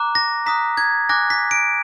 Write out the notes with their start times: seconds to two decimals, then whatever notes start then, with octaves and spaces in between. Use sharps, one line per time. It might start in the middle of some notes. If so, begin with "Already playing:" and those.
Already playing: A#5 D6 F#6
0.15 A#6
0.46 A#5 D#6 F#6 B6
0.77 G#6
1.09 G#5 D6 F#6 A#6
1.30 B6
1.51 D7